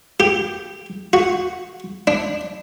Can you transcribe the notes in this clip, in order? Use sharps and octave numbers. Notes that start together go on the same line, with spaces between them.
G4
F#4
D4